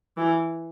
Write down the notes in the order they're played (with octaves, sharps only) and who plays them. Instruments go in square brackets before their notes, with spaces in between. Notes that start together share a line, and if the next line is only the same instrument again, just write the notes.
[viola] E3